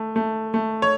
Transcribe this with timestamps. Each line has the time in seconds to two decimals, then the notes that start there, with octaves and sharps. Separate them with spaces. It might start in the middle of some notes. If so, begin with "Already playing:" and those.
Already playing: A3
0.16 A3
0.54 A3
0.82 C#5